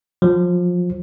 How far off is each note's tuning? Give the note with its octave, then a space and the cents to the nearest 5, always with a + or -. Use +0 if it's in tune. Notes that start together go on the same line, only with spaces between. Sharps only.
F3 +25